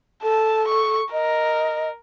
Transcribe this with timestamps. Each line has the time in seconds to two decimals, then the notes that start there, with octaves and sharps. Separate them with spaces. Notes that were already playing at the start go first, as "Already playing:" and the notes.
0.23 A4 A5
0.68 C#6
1.13 A#4 D#5